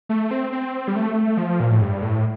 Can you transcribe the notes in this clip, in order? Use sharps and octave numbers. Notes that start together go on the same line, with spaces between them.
A3
C4
C4
G3
A3
F3
A#2
A2
G2
A2